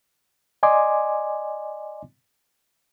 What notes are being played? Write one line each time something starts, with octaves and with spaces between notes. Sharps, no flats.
D5 D#5 G#5 C6 D6